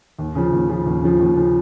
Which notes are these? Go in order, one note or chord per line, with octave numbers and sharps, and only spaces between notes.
D#2
C#3 F3
D#2
C#3 F3
D#2
C#3 F3
D#2
C#3 F3